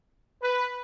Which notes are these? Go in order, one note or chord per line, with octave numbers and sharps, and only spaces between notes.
B4